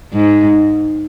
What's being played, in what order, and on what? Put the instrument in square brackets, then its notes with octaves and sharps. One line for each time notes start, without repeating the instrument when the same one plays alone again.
[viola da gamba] G#2